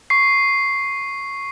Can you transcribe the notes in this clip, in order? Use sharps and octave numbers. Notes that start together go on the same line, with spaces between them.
C#6 C7